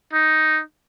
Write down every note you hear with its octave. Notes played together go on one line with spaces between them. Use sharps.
D#4